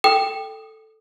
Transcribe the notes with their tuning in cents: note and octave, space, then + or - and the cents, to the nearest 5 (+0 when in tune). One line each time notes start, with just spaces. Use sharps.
A4 +0 G5 +0 D#6 +0